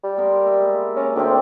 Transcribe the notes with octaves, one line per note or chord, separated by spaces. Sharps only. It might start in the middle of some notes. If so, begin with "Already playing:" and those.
G3
B3 A#4 C6
E5
G#3 A#3
C#4 A#4 D5 A#5
D2 C4 G4